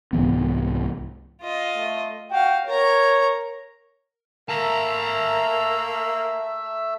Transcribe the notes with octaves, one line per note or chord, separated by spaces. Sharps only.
C2 G#2 E3 B3
F4 D#5
A3
F#4 F5 G5
A#4 C#5 A#5
A3 A#3 E5 A5 A#5 E6